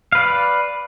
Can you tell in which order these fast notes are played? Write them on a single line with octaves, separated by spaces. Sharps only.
F5 B4 D5